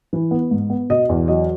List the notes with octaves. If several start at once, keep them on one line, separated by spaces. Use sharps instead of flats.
E3
B3
G#2
B3
B2 D#5
E2
F#3 D#5